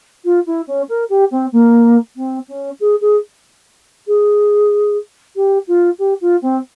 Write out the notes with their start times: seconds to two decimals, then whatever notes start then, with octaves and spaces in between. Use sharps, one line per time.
0.24 F4
0.46 E4
0.67 C#4
0.88 A#4
1.09 G4
1.30 C4
1.52 A#3
2.16 C4
2.48 C#4
2.80 G#4
3.01 G#4
4.07 G#4
5.35 G4
5.67 F4
5.98 G4
6.21 F4
6.41 C4